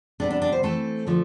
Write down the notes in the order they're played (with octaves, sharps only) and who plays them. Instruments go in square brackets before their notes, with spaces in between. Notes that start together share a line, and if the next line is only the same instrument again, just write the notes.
[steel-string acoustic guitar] C3 G3 B3 D4
D4
D4
C5
E3 A3 C4 A4
D3 F3 A3